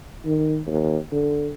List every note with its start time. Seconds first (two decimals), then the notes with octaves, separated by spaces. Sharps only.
0.25 D#3
0.67 D#2
1.12 D3